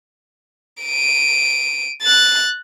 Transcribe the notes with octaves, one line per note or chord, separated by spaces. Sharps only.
D7 D#7
F#6 A6